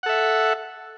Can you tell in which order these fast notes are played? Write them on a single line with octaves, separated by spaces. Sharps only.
F#5 A4 E5